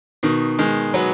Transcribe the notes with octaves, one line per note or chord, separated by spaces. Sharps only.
B2 D#3
D#3 G#3
F#3 B3